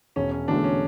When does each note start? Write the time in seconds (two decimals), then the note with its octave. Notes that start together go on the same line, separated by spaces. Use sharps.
0.16 E1 C#4
0.32 C#4
0.48 E2 D3 F#3 A3 D4
0.64 C#4